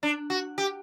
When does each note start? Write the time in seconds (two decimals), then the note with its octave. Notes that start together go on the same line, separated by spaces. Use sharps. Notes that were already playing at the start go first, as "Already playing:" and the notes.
0.03 D4
0.30 F#4
0.58 G4